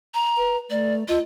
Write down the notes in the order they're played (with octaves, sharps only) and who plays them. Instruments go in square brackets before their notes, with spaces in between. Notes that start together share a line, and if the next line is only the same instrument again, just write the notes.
[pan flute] A#5
[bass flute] B4
[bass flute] A3 [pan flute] D5
[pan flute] F4 [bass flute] D#5